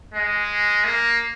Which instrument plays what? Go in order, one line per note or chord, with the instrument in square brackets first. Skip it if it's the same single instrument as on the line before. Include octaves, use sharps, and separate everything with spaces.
[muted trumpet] G#3
A#3